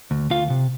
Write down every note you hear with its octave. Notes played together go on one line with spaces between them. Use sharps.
D2
D2 F4 F5
C3